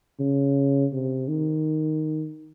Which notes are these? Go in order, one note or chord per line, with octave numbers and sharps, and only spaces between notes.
C#3
C3
D#3